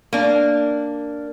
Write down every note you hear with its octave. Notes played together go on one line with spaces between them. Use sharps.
A#3 D4